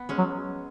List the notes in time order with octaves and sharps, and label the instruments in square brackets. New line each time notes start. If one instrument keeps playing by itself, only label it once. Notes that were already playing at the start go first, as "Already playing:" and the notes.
Already playing: [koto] B3
G#3 C#4
[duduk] F#3